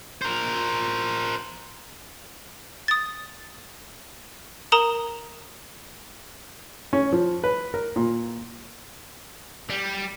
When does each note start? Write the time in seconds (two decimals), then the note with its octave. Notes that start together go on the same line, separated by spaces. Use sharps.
0.22 A#4 C5
2.88 D#6 A6
4.72 A#4 A#5 D#6 E7 F#7
6.93 C#4
7.13 F3
7.44 B4
7.74 A#4
7.96 A#2
9.70 G3